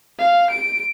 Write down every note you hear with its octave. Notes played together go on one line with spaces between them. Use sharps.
F5
D7